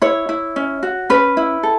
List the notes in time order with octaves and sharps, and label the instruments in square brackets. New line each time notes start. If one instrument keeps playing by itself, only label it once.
[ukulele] E4 C#5
E4
C#4
F#4
C#4 B4
E4
A4